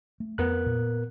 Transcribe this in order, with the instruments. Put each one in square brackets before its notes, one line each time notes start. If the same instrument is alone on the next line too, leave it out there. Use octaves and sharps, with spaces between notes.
[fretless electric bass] A3
[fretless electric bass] F2 [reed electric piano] B3 A#4 F#6
[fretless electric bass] A#2